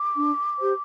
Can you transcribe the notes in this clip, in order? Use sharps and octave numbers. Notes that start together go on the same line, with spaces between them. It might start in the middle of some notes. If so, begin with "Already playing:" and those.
Already playing: D6
D4
G4 C5